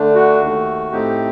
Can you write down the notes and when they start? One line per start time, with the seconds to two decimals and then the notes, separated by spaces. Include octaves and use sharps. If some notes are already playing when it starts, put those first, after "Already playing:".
Already playing: D3 A3 D4
0.15 F#4
0.40 D#2 D#3 A3
0.92 A2 A3 C4 D#4 G4